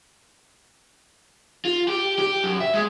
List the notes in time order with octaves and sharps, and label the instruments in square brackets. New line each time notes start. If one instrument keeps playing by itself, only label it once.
[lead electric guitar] F4
G4
G4
F#2
E5
G#3